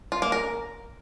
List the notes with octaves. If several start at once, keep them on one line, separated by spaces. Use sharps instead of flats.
F4
A#3
A#4